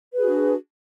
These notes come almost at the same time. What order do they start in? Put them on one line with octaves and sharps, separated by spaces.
B4 G#4 F#4 D4